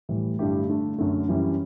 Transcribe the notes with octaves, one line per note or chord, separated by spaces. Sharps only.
A2 E3 G3
G2 D3 A3 E4 G4
D3 A3 D4
F#2 D3 A3
F#2 E3 G3 C#4 E4